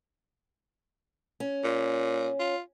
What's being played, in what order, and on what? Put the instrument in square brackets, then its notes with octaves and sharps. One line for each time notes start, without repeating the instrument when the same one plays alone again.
[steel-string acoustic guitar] C#4
[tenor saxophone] A#2
F4